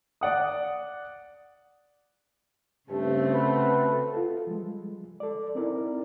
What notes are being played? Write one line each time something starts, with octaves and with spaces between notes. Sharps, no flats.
D5 F#5 D#6
G2 C#3 A3 C4
F#4 A4 B4
F4 A4
F3 G3 G#3
A4 D5
C4 D#4 E4 A#4 D5